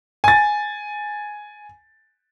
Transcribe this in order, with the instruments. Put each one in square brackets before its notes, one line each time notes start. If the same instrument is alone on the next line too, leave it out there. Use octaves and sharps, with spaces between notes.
[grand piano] G#5 A6